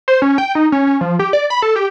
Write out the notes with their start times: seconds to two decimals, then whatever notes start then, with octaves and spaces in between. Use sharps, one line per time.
0.08 C5
0.22 C#4
0.38 G5
0.55 D#4
0.72 C#4
0.87 C#4
1.01 F3
1.19 G4
1.33 D5
1.50 B5
1.62 A4
1.76 G4